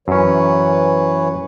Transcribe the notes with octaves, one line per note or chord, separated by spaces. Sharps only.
F#2 E3 C#4 B4 C#5